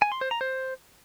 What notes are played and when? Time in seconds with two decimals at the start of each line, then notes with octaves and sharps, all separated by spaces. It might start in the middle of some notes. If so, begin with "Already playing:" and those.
0.02 G#5
0.12 C6
0.21 C5
0.31 A#5
0.41 C5